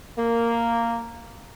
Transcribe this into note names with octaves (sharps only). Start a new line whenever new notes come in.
A#3